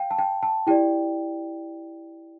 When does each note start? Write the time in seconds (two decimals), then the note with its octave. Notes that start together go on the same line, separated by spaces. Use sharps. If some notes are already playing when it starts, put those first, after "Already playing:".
Already playing: F5 G5
0.11 A5
0.18 G5
0.43 A5
0.67 E4 G4 D5 G5